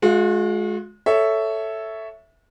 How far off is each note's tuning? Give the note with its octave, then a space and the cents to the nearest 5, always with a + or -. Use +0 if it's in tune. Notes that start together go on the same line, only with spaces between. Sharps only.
G#3 +25 F#4 -40 F5 -20
A4 +0 C#5 +10 E5 +0